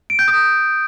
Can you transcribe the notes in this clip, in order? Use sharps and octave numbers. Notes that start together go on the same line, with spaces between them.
D7
G6
D#6